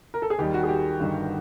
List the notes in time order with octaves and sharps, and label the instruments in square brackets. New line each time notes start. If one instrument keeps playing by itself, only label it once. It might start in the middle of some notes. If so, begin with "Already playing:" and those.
[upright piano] A#4
A4
G#4
[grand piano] D#2 D#3 G3 [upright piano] G4
[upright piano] F#4
G#4
G4
[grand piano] G1 G2 D#3